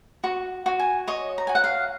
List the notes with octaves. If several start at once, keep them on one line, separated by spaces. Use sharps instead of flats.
F#4 C#6
F#4
G#5
C#5 D#5
A#5
F#4 G#5
F#5
F5